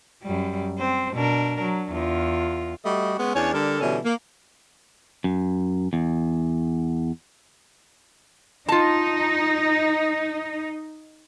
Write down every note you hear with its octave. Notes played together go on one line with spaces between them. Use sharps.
F#2 G3
C4 C5
B2 D4 A#4
F#3
E2 F4
G3 A3 F#4 D#5
G#3 B3 C#4
E2 C#4 D4 C#5
D3 G3 A4 A#4
B2 D3 E3 G3 C#4
A#3
F#2
E2
D#4 F4 A5